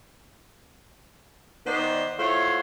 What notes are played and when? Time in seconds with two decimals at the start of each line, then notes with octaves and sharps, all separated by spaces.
1.66 D#3 B3 D#4 C5 D5
2.19 A3 E4 F4 C5 C#5 F#5